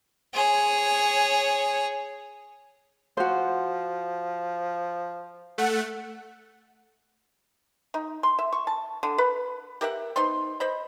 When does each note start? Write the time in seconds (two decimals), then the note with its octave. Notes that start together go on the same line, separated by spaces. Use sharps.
0.34 G#4 C#5
3.17 F3 F#4 C5
5.58 A3 F#5
7.94 D#4
8.23 C6
8.39 E5
8.53 C#6
8.67 A5
9.03 D3
9.18 B4
9.81 G4 A#4 E5 F#5
10.16 B3 D#4 C5 C6
10.60 C5 D#5 B5